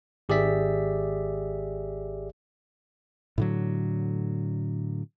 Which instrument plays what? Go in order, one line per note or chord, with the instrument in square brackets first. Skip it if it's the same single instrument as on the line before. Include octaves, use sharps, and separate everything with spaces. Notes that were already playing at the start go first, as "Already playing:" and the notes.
[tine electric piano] G#1 G4 G#4 D5 E5 B6
[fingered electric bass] A2 D3 F#3